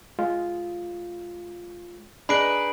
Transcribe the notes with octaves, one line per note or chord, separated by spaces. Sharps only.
G#3 F4
G#3 D4 D#4 B4 B5 D7 F#7